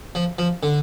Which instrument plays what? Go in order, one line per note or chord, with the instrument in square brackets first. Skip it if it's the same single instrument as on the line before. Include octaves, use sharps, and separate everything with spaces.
[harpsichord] F3
F3
D3